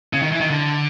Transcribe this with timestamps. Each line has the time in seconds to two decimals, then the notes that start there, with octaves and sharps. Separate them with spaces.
0.13 C#3
0.22 D#3
0.32 E3
0.40 D#3
0.50 D3